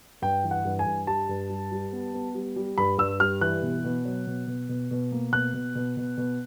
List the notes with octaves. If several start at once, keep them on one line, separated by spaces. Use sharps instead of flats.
G2 G5
E3
F#5
G2
G#5
G2
G3 A5
G2
G3
G3
B3
B3
G3
G3
G2 B5
G2 E6
G3 F6
E3 F#6
B2
B2
F#3
B2
B2
B2
B2
A#3
B2 F#6
B2
B2
B2
B2